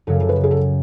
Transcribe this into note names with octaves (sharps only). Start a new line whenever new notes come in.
F#2 C#3 F#3 A4
A4
B4
G#4
A4